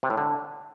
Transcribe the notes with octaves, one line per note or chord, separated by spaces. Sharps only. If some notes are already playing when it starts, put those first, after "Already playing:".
C3
A2
D3